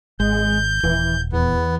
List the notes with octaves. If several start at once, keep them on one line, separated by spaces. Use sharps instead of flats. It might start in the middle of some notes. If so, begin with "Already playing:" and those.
G#1 G#3 G6
D#1 E3
E2 B3